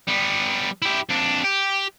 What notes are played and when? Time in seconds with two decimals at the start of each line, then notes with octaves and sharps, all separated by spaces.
0.07 G3 B3
0.82 E4 G4
1.09 F2 D4
1.44 G4